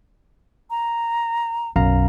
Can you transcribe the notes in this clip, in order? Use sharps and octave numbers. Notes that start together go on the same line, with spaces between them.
A#5
B1 F#2 F5 A#5